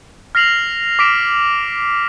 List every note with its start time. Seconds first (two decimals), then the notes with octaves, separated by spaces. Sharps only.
0.35 F6 A#6 C7 F7 F#7
0.99 D6 B6 D7 E7